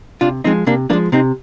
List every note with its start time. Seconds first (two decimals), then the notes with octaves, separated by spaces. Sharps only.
0.21 C3 D4 F4
0.44 F3 G#3 C4 D#4
0.67 C3 A#3 D4
0.90 F3 G#3 A#3 D4
1.12 C3 C4 D#4